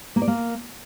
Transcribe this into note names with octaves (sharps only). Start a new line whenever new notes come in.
A#3
D5
A#3